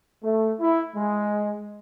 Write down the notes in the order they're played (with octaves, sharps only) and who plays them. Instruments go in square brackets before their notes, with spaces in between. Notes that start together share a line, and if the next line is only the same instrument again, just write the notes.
[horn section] A3
E4
G#3